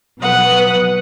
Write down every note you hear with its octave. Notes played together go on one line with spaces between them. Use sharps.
B2 F#3 B4 F#5 D#6